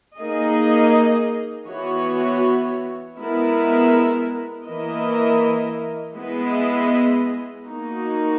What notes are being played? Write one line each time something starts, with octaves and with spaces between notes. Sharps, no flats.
A#3 D#4 G#4 D#5
E3 B3 F#4 C#5
G#3 B3 E4 A#4
E3 A#3 E4 A#4 D#5
G#3 B3 E4 G#4 D#5
A#3 D#4 F#4